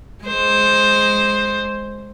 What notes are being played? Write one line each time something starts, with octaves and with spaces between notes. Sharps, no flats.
G#3 C5